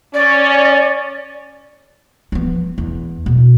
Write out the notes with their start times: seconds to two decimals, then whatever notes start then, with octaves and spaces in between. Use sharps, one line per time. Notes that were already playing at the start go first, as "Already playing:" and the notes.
0.14 C#4 D5
2.32 F3 B3
2.78 E2
3.26 B2